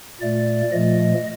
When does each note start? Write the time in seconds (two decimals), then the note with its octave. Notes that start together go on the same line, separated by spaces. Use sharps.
0.21 A#2 A3 D5
0.72 A#2 F3 A3 D#5